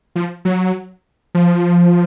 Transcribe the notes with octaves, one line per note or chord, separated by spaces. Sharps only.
F3
F#3
F3